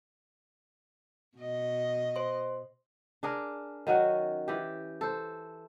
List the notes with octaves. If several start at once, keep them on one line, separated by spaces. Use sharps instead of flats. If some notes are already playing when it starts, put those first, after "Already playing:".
B2 D#5
C5 C6
D4 G#4 A#4
D#3 F#3 C#4 F#4
E3 G4
A4 C5